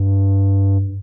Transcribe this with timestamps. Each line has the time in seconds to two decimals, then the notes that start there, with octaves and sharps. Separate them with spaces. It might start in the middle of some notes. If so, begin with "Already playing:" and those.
Already playing: G2